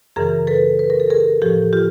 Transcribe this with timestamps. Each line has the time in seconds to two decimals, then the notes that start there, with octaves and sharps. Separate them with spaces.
0.16 F#2 C#3 E3 G#4 A#4
0.47 A4 B4
0.79 B4
0.90 A#4
1.00 A4
1.10 G#4 A#4
1.42 A2 F3 G4 A4
1.73 F4 G4